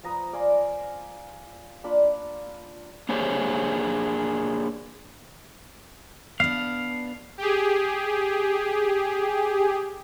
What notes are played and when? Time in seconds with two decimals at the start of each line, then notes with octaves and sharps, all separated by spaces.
0.03 F3 B4 A#5 D#6
0.33 D5 F5 G#5 C6
1.84 A#3 D4 F4 B5
3.09 A#3 D4 G4 G#4 C5 C#5
6.40 B3 D4 F5
7.38 G4 G#4